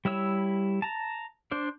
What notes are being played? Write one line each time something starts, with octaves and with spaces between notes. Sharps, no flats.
G3 E4 C#5 E6
A5 A#5
D4 C5 D5